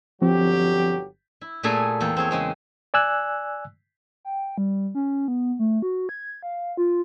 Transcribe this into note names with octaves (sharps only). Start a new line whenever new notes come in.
G1 F3 F#3 C4 G4
E4
A#2 A3 G#4 A4 G#5 A#5
E2 A#3 A4 G5
C4 G#4 C#5
C#3 G#3 C4
D5 G#5 E6 F#6
G5
G3
C#4
B3
A3
F#4
G#6
F5
F4